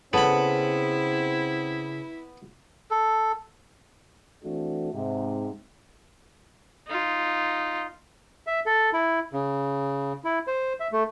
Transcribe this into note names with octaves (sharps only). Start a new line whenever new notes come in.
C#3 B3 C4 E4 A4 B5
A4
E3 A3 C4 D4 F#4 A4
G#2 C3
D#4 F4
E5
A4
E4
C#3
E4
C5
E5
A3